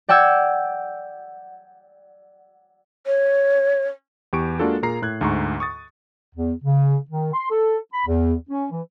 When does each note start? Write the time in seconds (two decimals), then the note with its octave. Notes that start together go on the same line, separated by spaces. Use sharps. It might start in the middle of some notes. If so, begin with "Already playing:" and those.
0.09 D5 F#5 G5 E6 G#6
3.06 C#5
4.33 E2 G4 C#6 D7
4.59 G#3 A#3 D4 F4 F#4 A4
4.83 A#2 G#4 A#4 A#5 C7
5.02 A2 F#6 G#6
5.21 D2 G#2 A#5 C6 C#6
5.60 C#6 D#6 A6
6.36 E2
6.64 C#3
7.10 D#3
7.34 C6
7.50 A4
7.94 B5
8.07 E2
8.50 C#4
8.71 E3